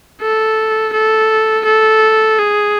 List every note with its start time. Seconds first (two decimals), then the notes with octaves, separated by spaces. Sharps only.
0.21 A4
0.93 A4
1.66 A4
2.39 G#4